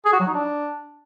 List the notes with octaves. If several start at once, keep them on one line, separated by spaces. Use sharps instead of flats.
G#4
F#4
F#3
D#4
D4